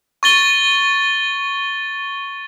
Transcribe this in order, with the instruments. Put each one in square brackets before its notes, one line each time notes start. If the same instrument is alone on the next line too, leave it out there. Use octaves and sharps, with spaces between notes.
[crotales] C#6 A6 G7